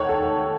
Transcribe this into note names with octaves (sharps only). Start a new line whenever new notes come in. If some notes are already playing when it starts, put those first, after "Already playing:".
Already playing: D#3 A3 C#5 F#5
A4